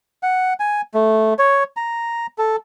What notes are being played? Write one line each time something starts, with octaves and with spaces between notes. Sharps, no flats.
F#5
G#5
A3
C#5
A#5
A4